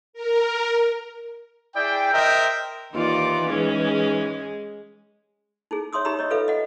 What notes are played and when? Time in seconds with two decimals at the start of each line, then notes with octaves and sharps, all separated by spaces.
0.13 A#4
1.76 E4 G#4 D5 G5
2.13 A#4 C5 D#5 E5 G5
2.93 D#2 E3 D#4 F4 D5
3.50 G#2 G#3 C#4 G#4
5.71 D#4 E4 G#4
5.93 C#5 E5 C6 D#6 E6
6.05 D#4 G4 E5 A#5 B5 E6
6.19 C#5 D#5
6.30 F4 A4 B4 E5 F5
6.48 D#5 F#5